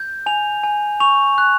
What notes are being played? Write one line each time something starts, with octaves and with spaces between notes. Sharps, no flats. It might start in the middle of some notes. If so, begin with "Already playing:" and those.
Already playing: G6
G#5 F7
G#5
C#6 F7
F#6